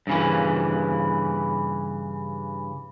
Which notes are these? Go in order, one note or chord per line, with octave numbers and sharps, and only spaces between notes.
G2 C#3 E3